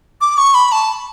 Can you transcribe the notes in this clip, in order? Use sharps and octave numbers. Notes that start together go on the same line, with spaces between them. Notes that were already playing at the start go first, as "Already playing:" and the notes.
D6
C#6
B5
A5